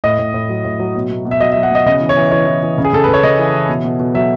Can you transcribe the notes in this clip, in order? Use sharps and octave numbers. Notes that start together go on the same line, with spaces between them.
A2 D#5
A2
A2
F#3
A2
F#3
B2
B2
B2
E5
F#3 D#5
E5
F#3
F#5
B2 D#5
C#3 D#5
E3
C#5
E3
E3 C#5
E3
E3
C#3
G#4
C#3 A4
C#3 B4
C#5
C#3 D#5
E3
E3
B2
B2
B2
F#3 E5